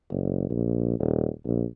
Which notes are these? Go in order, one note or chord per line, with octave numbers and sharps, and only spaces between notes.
F#1
A#1
D#1
A#1